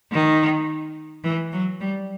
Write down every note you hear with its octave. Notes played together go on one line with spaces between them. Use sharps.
D#3
E3
F#3
G3